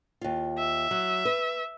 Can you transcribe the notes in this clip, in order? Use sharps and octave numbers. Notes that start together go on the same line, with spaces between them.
D#2 F4
E5
F#3
B4